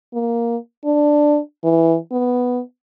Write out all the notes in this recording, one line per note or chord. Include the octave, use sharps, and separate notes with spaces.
A#3
D4
E3
B3